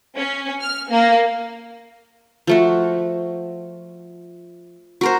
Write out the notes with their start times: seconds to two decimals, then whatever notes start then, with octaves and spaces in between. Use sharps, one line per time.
0.16 C#4
0.61 F6
0.90 A#3
2.47 F3 A3 F#4
5.01 F#4 A#4 C5